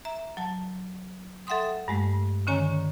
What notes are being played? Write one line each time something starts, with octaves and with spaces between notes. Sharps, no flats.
E5 A#5
F#3 A5
A4 E5 F#5 G5 C6 D#6
G2 G#3 A3
D3 D#3 C#4 C#5 G#5 A#5